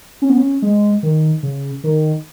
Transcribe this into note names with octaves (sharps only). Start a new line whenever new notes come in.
C#4
B3
C#4
G#3
D#3
C#3
D#3